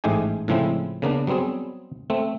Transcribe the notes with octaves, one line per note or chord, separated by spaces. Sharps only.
A1 G#2 G#3 A3 G4 G#5
A2 C#3 F3 G#3 C4 E4
C#3 A#3 B3 D4
F#3 G3 B3 C4 G#4
A3 C4